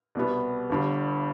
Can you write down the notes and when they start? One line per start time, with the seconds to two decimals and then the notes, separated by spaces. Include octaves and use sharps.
0.15 C2 B2 G3 B3
0.70 G1 G2 D3